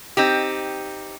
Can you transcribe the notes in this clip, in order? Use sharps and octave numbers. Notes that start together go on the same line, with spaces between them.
C4 D#4 G4